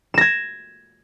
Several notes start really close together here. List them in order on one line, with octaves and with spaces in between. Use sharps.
E7 A#6 G#6